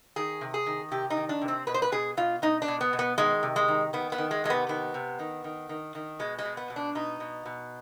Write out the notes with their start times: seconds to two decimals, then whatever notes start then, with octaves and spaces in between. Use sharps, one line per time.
0.16 D#3 G#4
0.41 C3
0.54 G#4
0.66 D#3
0.91 C3 G4
1.10 D#4
1.17 D#3
1.29 D4
1.42 C3
1.48 C4
1.67 B2 B4
1.74 C5
1.82 B4
1.92 B2 G#4
2.17 B2 F4
2.42 B2 D#4
2.62 D4
2.68 B2
2.81 B3
2.93 B2
2.99 B3
3.18 D#3 G#3
3.43 C3
3.56 G#3
3.68 D#3
3.93 D#3 B3
4.12 B3
4.18 D#3
4.31 G#3
4.44 C3 G#3
4.50 B3
4.69 D#3 B3
4.94 C3
5.19 D#3
5.44 D#3
5.69 D#3
5.95 D#3
6.19 B2 G#3
6.39 G#3
6.45 B2
6.57 B3
6.70 B2
6.76 D4
6.95 B2 D#4
7.20 B2
7.46 B2